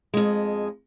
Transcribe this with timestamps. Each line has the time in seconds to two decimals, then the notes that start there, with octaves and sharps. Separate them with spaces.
0.14 F2 G#3